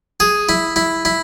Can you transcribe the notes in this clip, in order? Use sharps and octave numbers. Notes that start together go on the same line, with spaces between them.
G#4
E4
E4
E4